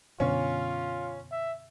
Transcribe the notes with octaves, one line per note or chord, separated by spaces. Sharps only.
F#2 B2 D3 C#4 F4
E5